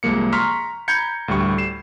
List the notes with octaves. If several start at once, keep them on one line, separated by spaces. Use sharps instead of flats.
C2 F3 G#3 A#3 C#7
A#5 C6 C#6 F6 B6
A#5 B5 G6 G#6 C#7
D2 A2 G3 C#6
C7 E7